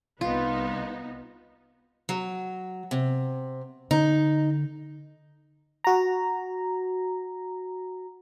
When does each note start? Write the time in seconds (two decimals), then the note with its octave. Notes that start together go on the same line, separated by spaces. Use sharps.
0.21 C2 B3 D#4 F4
2.09 F#3
2.91 C3
3.91 D3 D#4
5.84 F#4 A#5